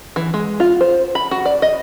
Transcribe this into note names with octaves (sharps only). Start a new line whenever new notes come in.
E3
G#3
F4
C5
B5
F#4
D5
D#5